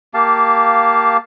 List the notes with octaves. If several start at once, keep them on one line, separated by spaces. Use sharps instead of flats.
A#3 G4 F5 A5